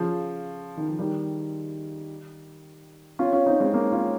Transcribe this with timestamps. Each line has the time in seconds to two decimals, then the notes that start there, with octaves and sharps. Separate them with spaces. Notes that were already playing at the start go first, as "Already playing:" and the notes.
Already playing: C#3 F3
0.77 D#3
0.88 F3
0.99 D#3 G3
3.19 C#4 F4
3.33 C#4 F4
3.46 C4 D#4
3.60 G#3 C4
3.74 A#3 C#4
3.92 C#4 F4